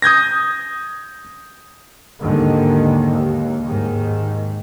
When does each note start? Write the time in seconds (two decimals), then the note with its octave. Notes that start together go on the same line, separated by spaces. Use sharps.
0.02 D#6 G6 G#6 A#6
2.21 D#2 G#2 D3 D#3
3.11 D#2
3.67 G#2 D#3